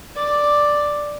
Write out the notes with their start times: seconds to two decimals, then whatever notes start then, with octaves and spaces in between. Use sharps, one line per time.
0.16 D5